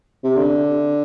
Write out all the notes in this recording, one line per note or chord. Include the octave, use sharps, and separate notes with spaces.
C3
D3